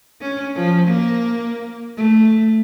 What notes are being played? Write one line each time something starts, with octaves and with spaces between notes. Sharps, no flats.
C#4
F3
A#3
A3